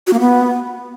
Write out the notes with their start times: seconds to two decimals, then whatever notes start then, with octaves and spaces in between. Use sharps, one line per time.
0.07 F#4
0.13 A#3
0.20 B3